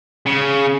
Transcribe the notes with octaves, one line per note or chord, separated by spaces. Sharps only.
C#3